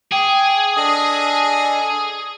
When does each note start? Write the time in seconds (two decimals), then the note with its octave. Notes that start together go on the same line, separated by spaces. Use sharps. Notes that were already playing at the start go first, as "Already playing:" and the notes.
0.12 G#4 G5 D6
0.77 D4 A4 D#5 D#6